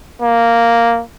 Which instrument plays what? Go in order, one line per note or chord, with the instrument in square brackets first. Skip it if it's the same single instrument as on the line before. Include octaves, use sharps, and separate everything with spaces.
[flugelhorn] A#3